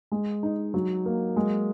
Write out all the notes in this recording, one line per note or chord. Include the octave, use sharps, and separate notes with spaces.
G#3
D#4
F#3
A#3
G#3